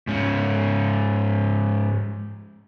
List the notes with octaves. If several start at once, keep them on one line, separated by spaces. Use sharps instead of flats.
G#2 C#4